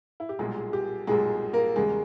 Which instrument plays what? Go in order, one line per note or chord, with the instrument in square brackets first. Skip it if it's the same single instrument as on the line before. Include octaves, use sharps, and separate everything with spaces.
[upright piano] E4
G4
B1 A#2 G3 G#3 G#4
G4
B1 A#2 G3 G#3 G#4
A#3 A#4
E2 C#3 G3 G#3 G#4